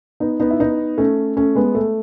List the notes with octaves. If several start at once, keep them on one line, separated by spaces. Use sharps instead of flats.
B3 D#4
B3 D#4
E4
B3 D#4
A3 C#4
A3 C#4
G#3 B3
A3